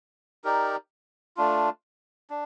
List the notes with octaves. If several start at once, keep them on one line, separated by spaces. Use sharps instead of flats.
D#4 G4 A#4 D5
A3 D4 F4
D4